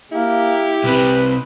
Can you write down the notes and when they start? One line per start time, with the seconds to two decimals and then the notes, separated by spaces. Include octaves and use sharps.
0.12 A#3 E4 G4
0.84 C2 C3 B4